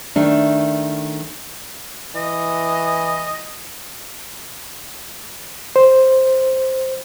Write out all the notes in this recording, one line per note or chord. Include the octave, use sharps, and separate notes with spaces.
D#3 A3 D4
E3 D#5
C5